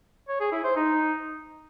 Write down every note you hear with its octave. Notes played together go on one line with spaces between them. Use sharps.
C#5
G#4
E4
C5
D#4